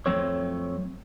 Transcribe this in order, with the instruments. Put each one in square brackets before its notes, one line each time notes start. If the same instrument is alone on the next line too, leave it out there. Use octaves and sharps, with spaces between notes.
[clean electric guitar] F2 F#3 A3 C4 A4 C#5